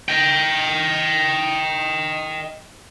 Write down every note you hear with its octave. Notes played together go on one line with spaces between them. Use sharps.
D#5 G5